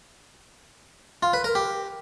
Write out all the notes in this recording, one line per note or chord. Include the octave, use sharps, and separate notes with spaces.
F4
B4
A#4
G4